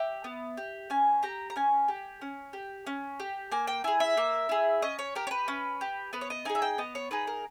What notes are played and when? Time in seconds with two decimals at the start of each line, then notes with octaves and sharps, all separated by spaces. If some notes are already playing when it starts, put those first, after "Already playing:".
Already playing: G4 E5
0.24 B3
0.57 G4
0.90 C#4 G#5
1.23 G4 A#5
1.50 A#5
1.56 C#4 G#5
1.88 G4
2.21 C#4
2.53 G4
2.86 C#4
3.20 G4
3.52 A#3 G#5
3.67 G5
3.84 E4 G#4 G#5
4.00 E5
4.17 A#3
4.49 E4 G#4
4.82 C#4 D#5
4.99 C#5
5.15 G4 A#4
5.27 C#5
5.31 B4
5.48 C#4
5.81 G4
6.13 B3 B4
6.21 C#5
6.30 D#5
6.45 D#4 G#4 G#5
6.55 E5
6.62 G5
6.78 B3 D#5
6.95 C#5
7.11 D#4 G#4 B4
7.27 A#4